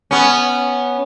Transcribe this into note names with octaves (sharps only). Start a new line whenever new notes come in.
B3 C#4